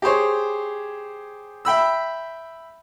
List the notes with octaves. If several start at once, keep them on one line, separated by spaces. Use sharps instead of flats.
G4 G#4 C5 C#5
E5 G5 B5 E6